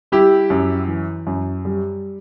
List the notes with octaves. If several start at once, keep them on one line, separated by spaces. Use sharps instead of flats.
G3 E4 G4
F#2
E3
F#2
G3